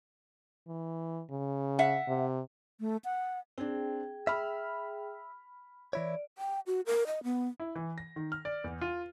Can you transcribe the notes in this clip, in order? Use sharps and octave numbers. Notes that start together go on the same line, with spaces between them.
E3
C#3
E5 F#5
C3
A3
F#5
C4 D4 G#4 G5
E5 B5 F6
E3 E4 C#5 D5
G5
F#4
A#4
D#5
B3
E4
E3
A#6
D#3
F6
D5
E2
F4